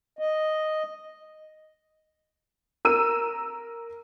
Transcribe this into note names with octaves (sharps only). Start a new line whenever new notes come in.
D#5
A#4 E6 D#7